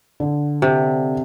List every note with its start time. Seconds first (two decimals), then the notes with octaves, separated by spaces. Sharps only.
0.20 D3
0.62 C3